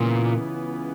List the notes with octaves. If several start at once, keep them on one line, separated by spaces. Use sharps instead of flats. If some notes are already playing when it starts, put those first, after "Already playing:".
Already playing: C#2 A#2 C#3 E3 B3